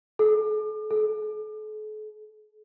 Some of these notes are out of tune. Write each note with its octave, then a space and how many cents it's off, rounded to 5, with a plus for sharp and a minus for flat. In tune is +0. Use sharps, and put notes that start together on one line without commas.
A4 -45
A4 -45